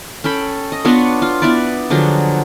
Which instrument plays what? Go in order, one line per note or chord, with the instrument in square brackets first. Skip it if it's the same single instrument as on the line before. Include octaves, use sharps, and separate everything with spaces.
[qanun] C#4 A4 G5 B5
D#5
B3 D4 F4 C#5
F4
B3 E4 B4 D5
D3 F3 F#3 G#4